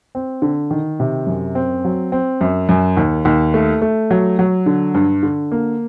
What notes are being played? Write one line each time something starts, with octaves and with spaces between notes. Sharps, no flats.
C4
D3
D#3
C3
F#2
C4
F#3
C4
F#2
F#2
D#2
D#2
A3
A3
F#3
F#3
D3
G2
D3
A#3